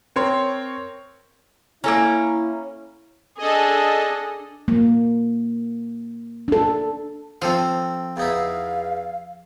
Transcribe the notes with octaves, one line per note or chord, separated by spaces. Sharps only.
C4 A#4 C#5 C6
A#3 C#4 E4 A4 A#5
D4 G#4 A4 D#5
A#3
D4 A4
F3 C4 A4 F5
E2 D#4 E4 F5